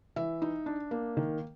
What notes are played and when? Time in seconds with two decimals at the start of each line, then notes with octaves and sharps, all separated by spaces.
0.16 E3 E5
0.42 D#4
0.66 D4
0.91 A#3
1.17 D#3